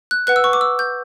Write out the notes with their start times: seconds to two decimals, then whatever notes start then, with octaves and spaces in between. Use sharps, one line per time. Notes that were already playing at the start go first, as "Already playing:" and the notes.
0.11 F#6
0.27 B4 F#5 F#6
0.36 E6
0.44 C#6
0.53 D6
0.61 E6
0.79 G6